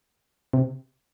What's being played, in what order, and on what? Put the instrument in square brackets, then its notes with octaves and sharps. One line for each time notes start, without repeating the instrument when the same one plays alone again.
[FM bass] C3